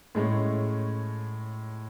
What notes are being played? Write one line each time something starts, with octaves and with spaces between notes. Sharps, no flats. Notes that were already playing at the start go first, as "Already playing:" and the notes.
A2 G#3 A3 C#4